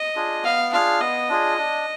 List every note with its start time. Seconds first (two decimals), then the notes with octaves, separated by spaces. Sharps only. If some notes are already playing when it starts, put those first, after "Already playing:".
Already playing: D#5
0.16 D4 F4 G#4
0.44 B3 F5
0.72 D4 F4 G#4 F5
1.01 B3 D#5
1.29 D4 F4 G#4
1.58 D4